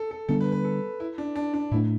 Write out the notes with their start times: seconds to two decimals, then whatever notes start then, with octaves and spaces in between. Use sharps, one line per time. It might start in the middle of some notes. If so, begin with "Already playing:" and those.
Already playing: A4
0.11 A4
0.29 D3 G3 B3 D4 A4
0.40 B4
0.52 B4
0.65 A4
1.00 E4
1.18 D4
1.36 D4
1.54 D4
1.71 A2 A3 D4 E4